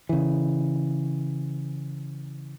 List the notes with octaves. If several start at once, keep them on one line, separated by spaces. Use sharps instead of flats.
C#3 E3